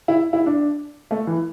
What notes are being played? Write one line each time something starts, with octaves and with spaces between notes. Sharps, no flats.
E4
E4
D4
A3
E3